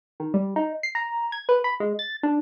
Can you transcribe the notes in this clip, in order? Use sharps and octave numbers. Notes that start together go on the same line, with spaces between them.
D#3
G3
D#4
C7
A#5
G#6
B4
B5
G#3
A6
D4